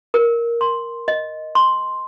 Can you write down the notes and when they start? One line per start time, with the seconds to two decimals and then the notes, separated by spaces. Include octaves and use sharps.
0.14 A#4
0.61 C6
1.08 D#5
1.55 C6